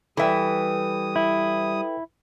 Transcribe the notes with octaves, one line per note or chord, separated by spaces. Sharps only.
E3 G3 A4 B4 E5 G5 D#6
E4